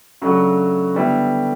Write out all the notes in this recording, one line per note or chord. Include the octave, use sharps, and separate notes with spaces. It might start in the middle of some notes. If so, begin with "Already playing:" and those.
C#3 F#3 A3 D4 F#4
D3 G3 B3 E4